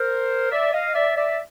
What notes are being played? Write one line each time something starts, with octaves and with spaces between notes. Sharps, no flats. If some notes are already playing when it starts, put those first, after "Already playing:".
Already playing: A#4 C5
D5 E5
D#5 F5
D5 E5
D5 E5